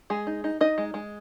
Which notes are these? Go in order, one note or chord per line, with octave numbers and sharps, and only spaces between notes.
G#3 G#4
D#4
D#4
D#4 D#5
G#3
G#3